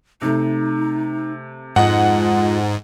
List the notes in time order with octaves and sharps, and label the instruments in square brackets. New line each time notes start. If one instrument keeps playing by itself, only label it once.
[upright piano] C3 A3 [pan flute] D#4
[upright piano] F2 D#5 [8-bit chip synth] G#2 [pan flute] F4 [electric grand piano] F#5